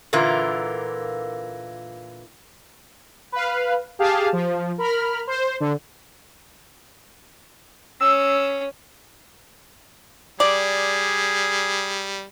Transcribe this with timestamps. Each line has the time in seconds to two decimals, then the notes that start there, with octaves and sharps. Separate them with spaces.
0.13 A#2 D3 E3 A#3 F4
3.32 B4 F5
3.99 G4 G#4 F5 A5
4.33 F3
4.78 A#4 B5 F6
5.27 C5
5.60 D3
8.01 C#4 E6
10.40 G3 G#4 D5